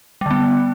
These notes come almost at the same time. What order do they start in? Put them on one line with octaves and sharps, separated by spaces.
G3 D3 B3